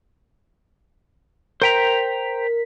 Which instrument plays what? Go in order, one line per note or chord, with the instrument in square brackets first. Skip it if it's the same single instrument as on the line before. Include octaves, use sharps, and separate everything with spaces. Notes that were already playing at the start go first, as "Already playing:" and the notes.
[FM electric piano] A#4 B6 [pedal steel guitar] C5 G5 A#5